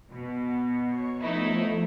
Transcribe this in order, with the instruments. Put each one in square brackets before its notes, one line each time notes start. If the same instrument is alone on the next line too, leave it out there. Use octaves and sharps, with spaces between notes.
[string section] B2
[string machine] C#5 C#6
[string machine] F3 A3 [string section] B3 D#4 E4